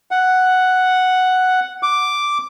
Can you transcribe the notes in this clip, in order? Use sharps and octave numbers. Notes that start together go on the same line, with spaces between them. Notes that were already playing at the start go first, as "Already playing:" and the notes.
F#5
D6